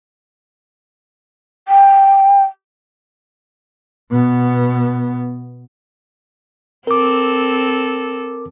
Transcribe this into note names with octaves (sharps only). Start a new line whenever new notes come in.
G5
B2 B3
C4 A4 A#4 D6